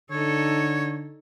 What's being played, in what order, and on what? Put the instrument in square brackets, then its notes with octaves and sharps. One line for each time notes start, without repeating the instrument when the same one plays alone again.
[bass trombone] D3 [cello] D#4 A4 [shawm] C#5